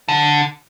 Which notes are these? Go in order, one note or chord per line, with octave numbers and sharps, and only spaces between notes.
D3